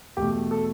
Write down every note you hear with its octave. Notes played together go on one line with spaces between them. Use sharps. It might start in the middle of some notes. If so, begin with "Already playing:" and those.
E2 B2 A3 G4
A4